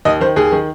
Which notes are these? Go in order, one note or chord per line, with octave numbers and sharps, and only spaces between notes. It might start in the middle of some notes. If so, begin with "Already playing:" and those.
D#2 D#5
D#3 C5
D#2 G#4
D#3